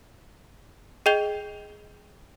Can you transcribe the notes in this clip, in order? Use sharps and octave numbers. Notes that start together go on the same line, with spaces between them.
G#4 D#5 G5 G6 F7 G7